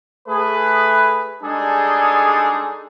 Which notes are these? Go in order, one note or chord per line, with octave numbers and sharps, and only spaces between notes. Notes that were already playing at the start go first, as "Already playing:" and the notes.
A3 G#4 B4
G3 G#3 D4 D#4 G#4 A4